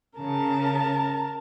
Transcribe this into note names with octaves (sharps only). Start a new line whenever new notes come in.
C#3 A#4 A5